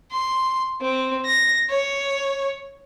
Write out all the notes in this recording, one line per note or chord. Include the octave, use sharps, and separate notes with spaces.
C6
C4
A#6
C#5